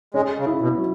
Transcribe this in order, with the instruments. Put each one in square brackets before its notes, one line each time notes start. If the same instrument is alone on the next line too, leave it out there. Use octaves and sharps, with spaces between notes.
[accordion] G#3 [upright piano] C#4
[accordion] C#3
[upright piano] E4
[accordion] B2
[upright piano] F#3